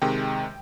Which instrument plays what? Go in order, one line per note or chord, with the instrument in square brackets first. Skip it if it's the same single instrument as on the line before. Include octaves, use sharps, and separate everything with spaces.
[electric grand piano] C3 D#3 G#3 G5